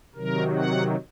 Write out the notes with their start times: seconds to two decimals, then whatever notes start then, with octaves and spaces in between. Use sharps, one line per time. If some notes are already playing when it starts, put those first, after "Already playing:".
0.15 C3 D#3 F#3 A#4
0.55 F#5